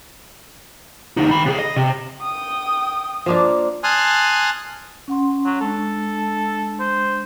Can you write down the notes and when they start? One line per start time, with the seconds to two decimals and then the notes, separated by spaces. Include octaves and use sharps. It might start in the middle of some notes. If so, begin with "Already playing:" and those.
1.17 D2 D#4
1.30 D#3 B5
1.46 C3 G#4
1.59 D#5
1.76 C3
2.22 G5 D#6
3.26 F3 A#3 D4
3.84 G#5 A5 C6 D#6 F6 F#6
5.08 C#4 F#5 C6
5.45 F#3
5.61 G#3 D4 A4
6.80 C5